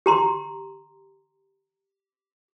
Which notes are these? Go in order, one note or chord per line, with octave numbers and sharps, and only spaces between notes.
G4 A#5 C6